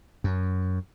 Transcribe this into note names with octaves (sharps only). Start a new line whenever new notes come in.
F#2